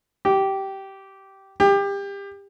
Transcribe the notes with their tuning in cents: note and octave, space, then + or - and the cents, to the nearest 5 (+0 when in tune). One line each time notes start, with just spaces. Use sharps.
G4 -15
G4 +25